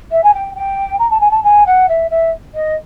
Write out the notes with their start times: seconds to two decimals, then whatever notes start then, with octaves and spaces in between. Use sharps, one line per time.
0.11 E5
0.23 G#5
0.34 G5
0.55 G5
0.99 A#5
1.10 A5
1.20 G#5
1.31 A5
1.44 G#5
1.66 F#5
1.88 E5
2.10 E5
2.54 D#5